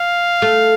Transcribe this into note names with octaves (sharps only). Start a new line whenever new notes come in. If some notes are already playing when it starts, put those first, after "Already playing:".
Already playing: F5
A3